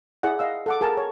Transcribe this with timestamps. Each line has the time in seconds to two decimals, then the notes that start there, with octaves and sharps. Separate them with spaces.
0.23 E4 G#4 D5 F#5
0.39 D#5 F5 E6
0.66 A4 F#5 D6
0.81 G#4 A#4 G#5 A5
0.97 C#5